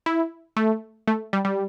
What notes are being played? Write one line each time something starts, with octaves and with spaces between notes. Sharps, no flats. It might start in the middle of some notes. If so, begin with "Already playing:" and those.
E4
A3
A3
G3
G3